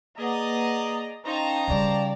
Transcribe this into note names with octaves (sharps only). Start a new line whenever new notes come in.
A#3 G#4 B4 D5 D#5 F#5 A#5
C#4 D#4 C5 F5 G5 A5 A#5
C#3 G3 D5